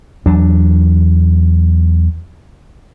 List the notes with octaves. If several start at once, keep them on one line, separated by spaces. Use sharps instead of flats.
E2 F#3 D4